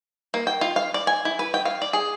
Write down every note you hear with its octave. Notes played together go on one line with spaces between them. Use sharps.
A#3
G5
F4
F5
D5
G#5
E4
B4
G5
F5
D5
G#4